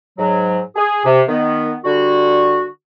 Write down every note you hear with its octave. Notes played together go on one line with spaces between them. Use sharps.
G#2 F#3
G#4
C3
D#3 B3
D3 G3 F#4